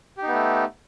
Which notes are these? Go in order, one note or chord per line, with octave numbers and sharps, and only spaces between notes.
A3 B3 D#4 G4